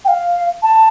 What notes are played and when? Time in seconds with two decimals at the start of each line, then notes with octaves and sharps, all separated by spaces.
0.05 G5
0.08 F5
0.62 A5